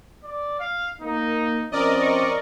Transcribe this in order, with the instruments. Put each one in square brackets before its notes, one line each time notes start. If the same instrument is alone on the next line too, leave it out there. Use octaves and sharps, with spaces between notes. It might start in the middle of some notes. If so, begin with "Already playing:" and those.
[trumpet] D5
F5
[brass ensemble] A#3 [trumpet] D#4
[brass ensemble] F3 C4 C#4 [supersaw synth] A#4 D5 D#5
[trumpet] C#6